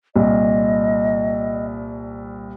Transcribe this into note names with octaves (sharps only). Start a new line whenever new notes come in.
C2 A#2 D#5